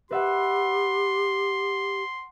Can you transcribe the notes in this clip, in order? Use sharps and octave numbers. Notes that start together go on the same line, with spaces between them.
G4 B4 E5 F#5 C6